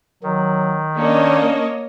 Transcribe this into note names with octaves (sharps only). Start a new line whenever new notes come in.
D#3 F#3
A#3 C#4 D4 C#5 D#5